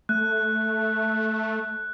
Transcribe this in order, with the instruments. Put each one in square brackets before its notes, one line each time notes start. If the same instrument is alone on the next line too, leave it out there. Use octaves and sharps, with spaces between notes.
[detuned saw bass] A3 [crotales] F#6